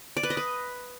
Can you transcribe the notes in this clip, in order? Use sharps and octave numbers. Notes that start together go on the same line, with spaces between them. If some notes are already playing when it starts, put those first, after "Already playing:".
D5
B4
D#5
B4